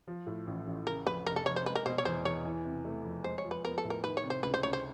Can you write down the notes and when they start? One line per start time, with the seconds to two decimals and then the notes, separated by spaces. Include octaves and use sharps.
0.07 F3
0.27 A2
0.47 A1
0.67 A1
0.86 C#3 A#4
1.06 F2 B4
1.26 F1 A#4
1.36 A4
1.46 F1 C#5
1.56 C5
1.66 G#3 B4
1.75 A#4
1.86 B2 C5
1.98 C#5
2.05 E2 C5
2.25 E2 C#5
2.45 E3
2.65 C3
2.85 A3
3.04 F2
3.24 G#3 C5
3.38 C#5
3.44 F3
3.51 B4
3.64 B3 A#4
3.78 A4
3.85 A2
3.90 A#4
4.04 D#3 B4
4.17 C#5
4.24 C3
4.30 C5
4.43 C#2 B4
4.54 C5
4.63 C#2 C#5
4.73 C5